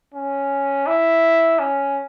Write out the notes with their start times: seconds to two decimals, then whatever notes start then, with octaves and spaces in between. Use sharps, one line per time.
0.14 C#4
0.87 E4
1.59 C#4